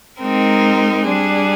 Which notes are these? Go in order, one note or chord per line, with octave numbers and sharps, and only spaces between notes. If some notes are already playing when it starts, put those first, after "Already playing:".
G#3 C4 D#4 A#4
G3 D4 G#4